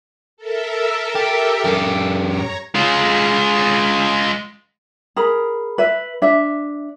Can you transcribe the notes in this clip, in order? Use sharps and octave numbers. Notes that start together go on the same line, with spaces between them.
A4 A#4 E5
G4
F#2 G4
C#5 A#5
G#3 F4
G#4 A#4 B5
B4 E5
D4 E5